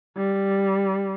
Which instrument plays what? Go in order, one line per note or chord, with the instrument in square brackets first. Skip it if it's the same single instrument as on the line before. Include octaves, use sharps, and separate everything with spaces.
[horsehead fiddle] G3